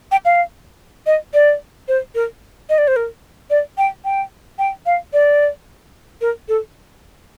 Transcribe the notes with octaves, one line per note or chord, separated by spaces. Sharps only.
G5
F5
D#5
D5
C5
A#4
D#5
D5
C5
A#4
D5
G5
G5
G5
F5
D5
A#4
A4